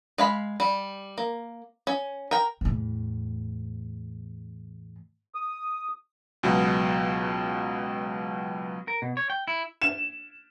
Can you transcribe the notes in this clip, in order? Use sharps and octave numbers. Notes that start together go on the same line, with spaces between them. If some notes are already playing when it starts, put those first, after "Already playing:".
G#3 F5 B5
G3
A#3
C#4
A#4 G5
E2 A2
D#6
C#2 B2 F#3
A#4
B2
C#5
G5
E4
E7